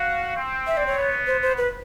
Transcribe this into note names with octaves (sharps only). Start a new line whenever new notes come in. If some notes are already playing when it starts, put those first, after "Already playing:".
Already playing: F#4 F5
C4
E5
D5
C#5
B3
C5
C5
B4